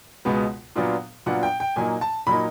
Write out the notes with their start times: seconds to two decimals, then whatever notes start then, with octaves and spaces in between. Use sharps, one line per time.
0.25 C#2 B2 G#3 B3
0.75 A#2 F#3 B3 D4 F4
1.26 A#2 F#3 B3 D4 F4 F#5
1.43 G5
1.60 G5
1.76 A#2 F#3 A#3 D#4 G#5
2.01 A5
2.27 A#2 F#3 A#3 D#4 B5